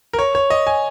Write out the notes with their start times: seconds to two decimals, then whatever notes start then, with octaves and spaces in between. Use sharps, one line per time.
0.13 A#4
0.19 C#5
0.35 C#5
0.50 D#5
0.67 G#5